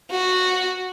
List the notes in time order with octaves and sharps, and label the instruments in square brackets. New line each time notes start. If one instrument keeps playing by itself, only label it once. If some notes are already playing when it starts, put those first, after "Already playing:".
[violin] F#4